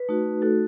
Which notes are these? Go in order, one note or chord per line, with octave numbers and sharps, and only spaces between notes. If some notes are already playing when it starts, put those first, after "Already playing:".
Already playing: B4
A3 D#4 F#4
A3 D#4 F#4 A4